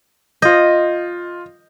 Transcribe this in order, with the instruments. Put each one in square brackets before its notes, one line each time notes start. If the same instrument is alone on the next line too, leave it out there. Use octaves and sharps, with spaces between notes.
[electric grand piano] F4 G6 [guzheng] D#5